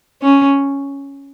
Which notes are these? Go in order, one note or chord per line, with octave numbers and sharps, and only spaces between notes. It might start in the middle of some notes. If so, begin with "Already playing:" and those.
C#4